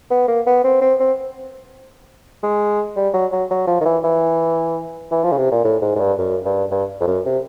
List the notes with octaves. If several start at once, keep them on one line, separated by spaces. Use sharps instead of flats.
B3
A#3
B3
C4
C4
C4
G#3
G3
F#3
F#3
F#3
F3
D#3
E3
E3
E3
F3
C#3
C3
A#2
A2
G#2
G#2
G2
F#2
G2
G2
F2
F#2
C3